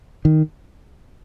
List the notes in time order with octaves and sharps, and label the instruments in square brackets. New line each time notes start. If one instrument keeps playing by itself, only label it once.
[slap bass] D#3